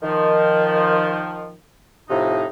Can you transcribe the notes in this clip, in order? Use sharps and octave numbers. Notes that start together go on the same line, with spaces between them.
D#3 F3
A2 C3 F3 D#4